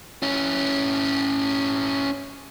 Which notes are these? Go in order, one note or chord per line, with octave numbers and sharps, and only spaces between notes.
C#4 E4